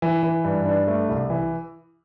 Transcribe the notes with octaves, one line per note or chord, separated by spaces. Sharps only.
E3
E3
G2
D4
A3
C2
E3